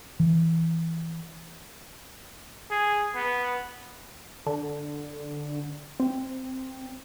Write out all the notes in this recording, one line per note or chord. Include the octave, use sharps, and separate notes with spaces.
E3
G#4
B3
D3
C4